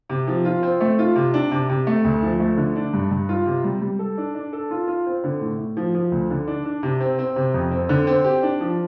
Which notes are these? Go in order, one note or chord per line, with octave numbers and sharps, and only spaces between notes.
C3
F3
F4
C4
A3
F4
C3
D4
C3
C3
A3
D2
F3
A3
D3
D4
G2
G2
F4
C3
G3
G3
A4
D4
D4
A4
F4
F4
C4
D3
A2
A2
F3
F3
D2
D3
D4
D4
C3
C4
C4
C3
F2
C4
D3
C4
G4
D4
F3